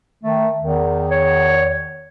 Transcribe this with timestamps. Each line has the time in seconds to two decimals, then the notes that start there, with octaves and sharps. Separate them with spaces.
0.24 D#3 A3
0.61 E2 D#3
1.10 C#5